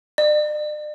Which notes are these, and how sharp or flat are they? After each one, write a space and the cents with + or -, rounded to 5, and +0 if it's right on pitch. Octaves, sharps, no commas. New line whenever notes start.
D5 +40